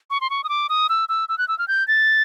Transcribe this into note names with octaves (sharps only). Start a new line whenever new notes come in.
C#6
C6
C#6
D#6
D6
D#6
E6
E6
E6
F#6
E6
F6
G6
A6